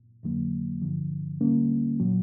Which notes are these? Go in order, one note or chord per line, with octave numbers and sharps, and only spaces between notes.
F2 D3 F#3 A#3
G2 D3 F3
D#2 D3 G3 A#3 C#4
A#2 F#3